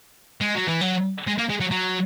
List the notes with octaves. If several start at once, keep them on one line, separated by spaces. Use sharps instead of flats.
G#3
F#3
E3
F#3
G#3
A#3
G#3
F#3
F#3